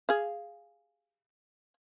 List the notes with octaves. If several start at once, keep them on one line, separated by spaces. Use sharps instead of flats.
G#4 F5